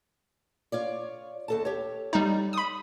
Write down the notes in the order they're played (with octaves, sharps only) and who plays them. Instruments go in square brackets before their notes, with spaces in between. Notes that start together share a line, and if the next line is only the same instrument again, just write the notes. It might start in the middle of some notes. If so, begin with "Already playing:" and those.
[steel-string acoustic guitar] F4 C#5 D5
D#2 A4 A5
G4 C#5
[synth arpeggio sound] G3 D#4
B5 D#6